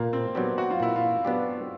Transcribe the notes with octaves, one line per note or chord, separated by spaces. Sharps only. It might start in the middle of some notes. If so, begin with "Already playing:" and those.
Already playing: A#2 A#3
C4
F#3 B3 C4 D4 G4
F#4
F4
A#2 E4
F4
F#3 B3 D4 G4